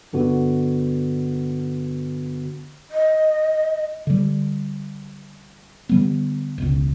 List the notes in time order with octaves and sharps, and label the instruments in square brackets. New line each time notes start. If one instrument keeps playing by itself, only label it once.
[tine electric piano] G2 D3 B3 F#4
[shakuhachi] D#5
[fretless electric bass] D3 G3
D3 G3 B3
E1 C#2